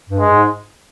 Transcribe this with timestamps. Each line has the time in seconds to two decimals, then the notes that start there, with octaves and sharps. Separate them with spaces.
0.10 G2
0.19 G#3
0.30 G#2